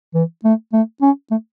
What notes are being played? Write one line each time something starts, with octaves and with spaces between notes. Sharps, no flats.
E3
A3
A3
C#4
A3